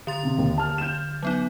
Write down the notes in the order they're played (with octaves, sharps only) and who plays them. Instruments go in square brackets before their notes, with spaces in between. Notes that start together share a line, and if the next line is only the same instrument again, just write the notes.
[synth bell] D3 C6 A6
[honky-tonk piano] C3
D#2
A5 F6
G6 E7
[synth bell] F#3 B3 D#4